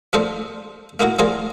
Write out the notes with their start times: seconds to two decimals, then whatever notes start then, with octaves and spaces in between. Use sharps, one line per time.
0.13 F3 A3 D#4 A4 C5 D5
1.00 A3 A#3 D#4 E4 F#4
1.19 F3 A3 F4 G#4 A#4 D5